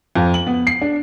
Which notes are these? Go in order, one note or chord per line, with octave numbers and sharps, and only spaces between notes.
F2
F#7
B3
C7
D4